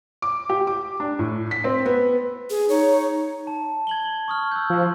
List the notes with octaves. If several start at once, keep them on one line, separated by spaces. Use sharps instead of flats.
D6
G4
D6
D4
A2
B6
C4
B3
G#4
D#4 C#5
A5
G#6 F#7 G7
C#6 D#6 F6
E6 F#6 G6
F3